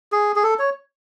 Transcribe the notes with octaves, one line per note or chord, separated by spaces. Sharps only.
G#4
G#4
A4
C#5